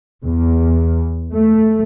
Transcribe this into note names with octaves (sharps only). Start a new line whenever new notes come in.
E2
A3